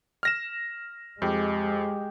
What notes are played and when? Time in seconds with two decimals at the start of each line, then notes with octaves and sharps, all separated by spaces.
0.23 F6 A#6 E7
1.22 F2 G#3 G4